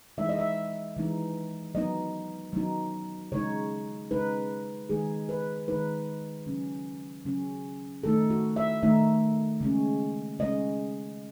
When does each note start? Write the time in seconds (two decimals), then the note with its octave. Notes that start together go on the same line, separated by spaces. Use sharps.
0.18 E3 G#3 D#4 E5
0.29 D#5
0.39 E5
0.96 E3 G#3 D#4
1.75 F#3 B3 D#4 D#5
2.53 F#3 B3 D#4
3.32 C#3 G#3 D#4 C#5
4.11 C#3 G#3 D#4 B4
4.89 D#3 G#3 D#4 G#4
5.29 B4
5.68 D#3 G#3 D#4 B4
6.46 C#3 F#3 C#4
7.26 C#3 F#3 C#4
8.04 D#3 A3 D#4 A4
8.30 F#4
8.56 E5
8.83 D#3 A3 D#4 E5
9.61 C#3 G#3 C#4
10.39 C#3 G#3 C#4 D#5